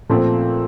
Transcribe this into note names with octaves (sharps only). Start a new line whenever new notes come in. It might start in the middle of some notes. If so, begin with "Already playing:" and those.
A#2 F3 A3 C4